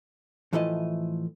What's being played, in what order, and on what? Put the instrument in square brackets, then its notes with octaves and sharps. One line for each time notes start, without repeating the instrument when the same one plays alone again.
[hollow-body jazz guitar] A2 E3 F3 A3 E4 D#5